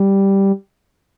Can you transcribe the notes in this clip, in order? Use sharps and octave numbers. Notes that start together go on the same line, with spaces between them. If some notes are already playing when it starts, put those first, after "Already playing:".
Already playing: G3